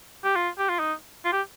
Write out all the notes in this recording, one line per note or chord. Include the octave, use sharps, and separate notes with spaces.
G4
F4
G4
F4
D#4
F4
G4